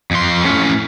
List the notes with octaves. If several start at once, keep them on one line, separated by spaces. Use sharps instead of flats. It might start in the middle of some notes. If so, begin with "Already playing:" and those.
F2 C6
A2 C#4